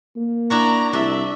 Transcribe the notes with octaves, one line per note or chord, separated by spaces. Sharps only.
A#3
D4 E4 F#4 A#5
C2 D4 E5